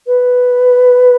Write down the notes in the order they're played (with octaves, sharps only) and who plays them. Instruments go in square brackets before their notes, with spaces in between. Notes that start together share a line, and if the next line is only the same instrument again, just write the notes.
[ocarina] B4